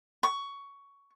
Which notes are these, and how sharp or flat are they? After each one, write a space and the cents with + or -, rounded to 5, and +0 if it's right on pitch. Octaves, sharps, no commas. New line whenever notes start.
C#6 +15